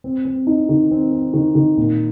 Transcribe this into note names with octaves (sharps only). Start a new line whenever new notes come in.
C4
C4
D#4
D#3
C4
C4
D#3
D#3
A#2